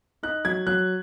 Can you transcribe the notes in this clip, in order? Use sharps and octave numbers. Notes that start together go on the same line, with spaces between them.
D#4 F#6
F#3 G#6
F#3 F#6